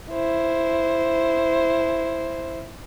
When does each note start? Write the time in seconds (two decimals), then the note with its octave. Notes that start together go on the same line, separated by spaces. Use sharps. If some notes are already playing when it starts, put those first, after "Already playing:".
0.10 E4 C5